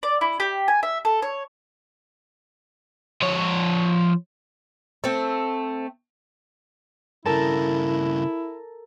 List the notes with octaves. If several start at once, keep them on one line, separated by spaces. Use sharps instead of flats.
D5
E4
G4
G#5
E5
A4
C#5
F3 C#5
A3 C4
G2 C#3 E4 A4 A#4 A5